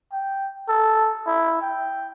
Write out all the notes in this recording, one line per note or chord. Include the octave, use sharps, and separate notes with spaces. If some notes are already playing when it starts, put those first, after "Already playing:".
G5
A4
E4
G5